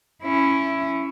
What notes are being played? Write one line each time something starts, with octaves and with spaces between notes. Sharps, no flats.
C#4 E4